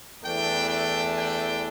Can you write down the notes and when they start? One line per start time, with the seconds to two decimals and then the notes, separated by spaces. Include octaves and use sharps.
0.22 E2 E3 A3 D4 G5
0.68 G5
1.16 G5